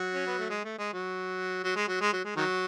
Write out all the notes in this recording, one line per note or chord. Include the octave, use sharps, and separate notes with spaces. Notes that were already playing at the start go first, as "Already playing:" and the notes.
Already playing: F#3
C#4
B3
A3
G#3
A3
G#3
F#3
F#3
G#3
F#3
G#3
F#3
G#3
D#3 F#3